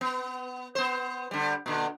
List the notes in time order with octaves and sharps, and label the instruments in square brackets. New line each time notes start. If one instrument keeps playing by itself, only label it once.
[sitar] B3
B3 C5
D3 G3
A#2 D3